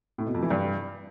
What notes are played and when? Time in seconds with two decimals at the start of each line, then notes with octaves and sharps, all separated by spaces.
0.18 A2
0.26 B2
0.34 F2
0.42 E3
0.50 G2